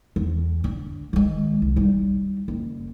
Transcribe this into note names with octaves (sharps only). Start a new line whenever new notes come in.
E2
D3
D#3 G#3
C2
G3 D#4
F#1